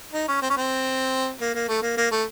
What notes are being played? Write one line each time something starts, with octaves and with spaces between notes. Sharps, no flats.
D#4
C#4
C4
C#4
C4
A#3
A#3
A3
A#3
A#3
A3